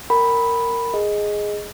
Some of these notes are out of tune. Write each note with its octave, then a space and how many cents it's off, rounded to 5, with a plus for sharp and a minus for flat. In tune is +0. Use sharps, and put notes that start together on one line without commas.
A#4 -15 G5 +0 B5 +0
G#4 +0 D#5 +0